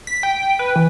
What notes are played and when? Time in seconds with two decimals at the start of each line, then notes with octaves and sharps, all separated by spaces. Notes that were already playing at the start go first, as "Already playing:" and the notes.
0.07 B6
0.23 G5
0.59 B4
0.76 E3